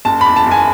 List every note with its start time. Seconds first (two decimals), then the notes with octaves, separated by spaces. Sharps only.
0.05 F#1 A5
0.21 E2 B5
0.36 A5
0.46 F#1 G#5